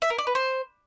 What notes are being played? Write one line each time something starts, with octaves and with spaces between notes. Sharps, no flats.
E5
A#4
D5
B4
C5